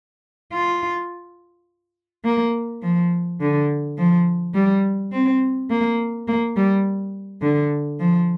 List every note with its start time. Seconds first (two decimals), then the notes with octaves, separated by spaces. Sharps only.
0.52 F4
2.24 A#3
2.82 F3
3.41 D3
3.97 F3
4.54 G3
5.12 C4
5.70 A#3
6.28 A#3
6.57 G3
7.42 D3
8.00 F3